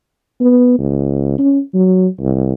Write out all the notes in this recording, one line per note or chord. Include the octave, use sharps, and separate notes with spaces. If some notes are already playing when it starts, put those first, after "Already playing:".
B3
C#2
C#4
F#3
C2